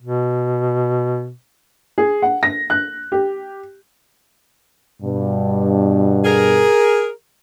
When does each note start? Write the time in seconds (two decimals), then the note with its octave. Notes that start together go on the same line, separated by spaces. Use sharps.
0.02 B2
1.98 G#4
2.22 F#5
2.43 A#6
2.70 F#6
3.12 G4
5.01 G2 B2
6.25 G#4 A#4